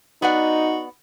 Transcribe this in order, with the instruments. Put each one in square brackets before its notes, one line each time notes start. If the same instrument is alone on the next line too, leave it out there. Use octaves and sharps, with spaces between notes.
[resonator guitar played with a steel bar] B3 D5 F#5 [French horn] D#4 [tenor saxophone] F#4